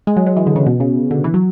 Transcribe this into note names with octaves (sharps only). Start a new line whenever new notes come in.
G#3
F#3
F#3
E3
D3
C#3
B2
C#3
D3
E3
F#3